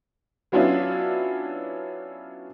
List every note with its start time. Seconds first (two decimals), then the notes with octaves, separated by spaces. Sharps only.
0.52 F#3 B3 C#4 D4 E4 F4